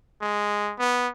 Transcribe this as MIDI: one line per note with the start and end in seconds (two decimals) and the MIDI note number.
0.22 0.74 56
0.79 1.09 59